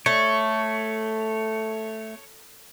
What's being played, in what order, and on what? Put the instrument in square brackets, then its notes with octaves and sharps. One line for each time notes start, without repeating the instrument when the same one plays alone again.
[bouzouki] A3 [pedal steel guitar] C#5